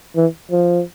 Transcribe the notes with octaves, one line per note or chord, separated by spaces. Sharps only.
E3
F3